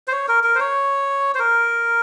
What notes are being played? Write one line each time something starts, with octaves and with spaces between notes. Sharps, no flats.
C5
C#5
A#4
A#4
C5
C#5
C5
A#4